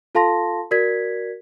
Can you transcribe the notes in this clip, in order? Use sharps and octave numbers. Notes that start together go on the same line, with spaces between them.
F4 A4 F5 A5 C6 A#6
F#4 A#4 D5 G#6 B6